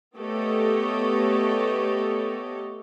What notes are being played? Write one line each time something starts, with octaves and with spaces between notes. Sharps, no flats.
A3 B3 G4 A4 C#5 D#5